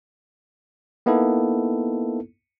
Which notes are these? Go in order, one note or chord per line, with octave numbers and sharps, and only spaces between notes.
A#3 B3 D#4 E4 A4